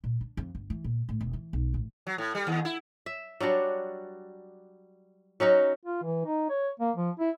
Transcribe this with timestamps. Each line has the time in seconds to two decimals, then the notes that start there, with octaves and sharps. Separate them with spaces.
0.04 A#2
0.21 D4
0.37 F2
0.55 G1
0.70 E3
0.84 A#2
1.09 A2
1.21 E1
1.33 E3
1.53 B1
1.74 A1
2.07 F#3
2.18 A2
2.35 G3
2.47 D#2
2.65 E4
3.06 E5
3.40 F#3 G3 D4 F#4
5.40 F#3 C#4 D#4 F#4
5.85 F4
6.02 E3
6.25 D#4
6.49 C#5
6.80 A#3
6.96 F3
7.19 E4